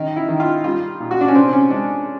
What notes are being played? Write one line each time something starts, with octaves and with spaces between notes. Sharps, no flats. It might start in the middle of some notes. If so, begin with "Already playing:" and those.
Already playing: D#3 D#4
E4
D#3
F4
G3 F4
A#2
F#4
D4
C#4
C3 C4
C#4
G#3 D4